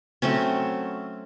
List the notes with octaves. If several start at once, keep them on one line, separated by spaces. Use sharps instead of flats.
F#3 A3 C4 C#4